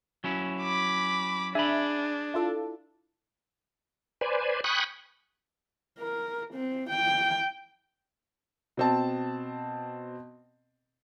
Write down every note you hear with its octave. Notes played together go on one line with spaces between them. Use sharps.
F#3 C#4 E4
B5 D6
D4 G#4 E5 B5
E4 F4 A4
B4 C5 D5 G#5
G5 G#5 B5 C#6 D#6 F#6
A#4
C4
G5
B2 C4 A5